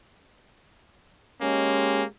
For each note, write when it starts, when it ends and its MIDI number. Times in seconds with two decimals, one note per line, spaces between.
1.42 2.04 56
1.42 2.05 58
1.42 2.03 61
1.42 2.04 67